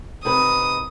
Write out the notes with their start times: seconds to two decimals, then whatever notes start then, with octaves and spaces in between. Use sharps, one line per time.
0.25 C3 D#4 B4 D#6